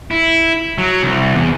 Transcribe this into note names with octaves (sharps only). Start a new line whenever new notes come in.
E4
F#3
C2
E2